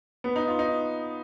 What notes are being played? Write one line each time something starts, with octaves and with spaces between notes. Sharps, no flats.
B3
D#4
F4
D#4